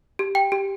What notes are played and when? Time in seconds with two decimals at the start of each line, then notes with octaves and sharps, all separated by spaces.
0.19 G4
0.35 G5
0.52 G4